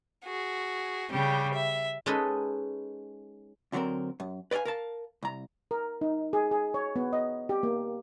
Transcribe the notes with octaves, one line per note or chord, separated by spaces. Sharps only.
F#4 G#4
C#3 G3 G4
E5
G#3 C#4 D#4 A4 B4 D#5
D2 D3 F#3 G3 C4 A#4
F#2
B4 D5 D#5 F5 G#5
A#4 F5 A5
C2 A#5
A#4
D#4
G#4
G#4
C#5
B3
D#5
G4
A#3